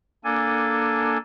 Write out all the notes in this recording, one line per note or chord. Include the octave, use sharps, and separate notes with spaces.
A#3 D4 A4 G#5